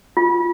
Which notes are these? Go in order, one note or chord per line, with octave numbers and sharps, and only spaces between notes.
F4